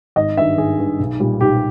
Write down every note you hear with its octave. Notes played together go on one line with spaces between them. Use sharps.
G#1 D#5
G2 D#3 E5
G#1 G#4
G2 D#3
B1
A#2 G3
B1 G4